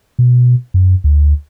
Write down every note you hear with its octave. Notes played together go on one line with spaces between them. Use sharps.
B2
F#2
D2